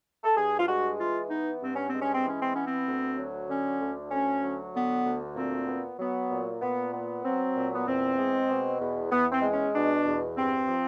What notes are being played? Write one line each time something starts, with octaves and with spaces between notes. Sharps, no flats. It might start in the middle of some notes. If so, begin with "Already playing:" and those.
A4
G2 G#4
F4
G#3 F#4
E3 F4
B3 D#4
G2 C4
C#4
C4
G#3
C#4
C4
E3 C#4
C4
B3 C#4
C4
D2
F#3
D3 C#4
D2
D2 C#4
F#3
D3 B3
D2
A#2 C4
B3
F#3 B3
A#2
A#2 B3
B3
F#3 C4
A#2
B3
E2 C4
G#3
B2
E2
E2 B3
C4
G#3
C#4
B2 D4
E2
G2 C4
F3